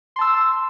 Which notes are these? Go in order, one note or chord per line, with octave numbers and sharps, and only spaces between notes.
A5 C6 E6